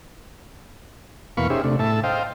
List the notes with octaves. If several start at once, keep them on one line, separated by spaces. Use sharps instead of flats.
E2 B2 A#3 F5 B5 C#6
C#4 D#4 G4 G#4 C5 E5
C3 A3 D4
A2 E5 A5
C5 D#5 F5 G5